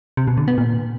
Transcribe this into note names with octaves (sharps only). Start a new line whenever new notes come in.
C3
B2
D3
B3
A#2